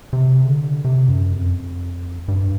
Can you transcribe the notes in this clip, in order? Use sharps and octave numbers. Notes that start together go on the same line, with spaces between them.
C3
C#3
D3
C3
F#2
F2
G2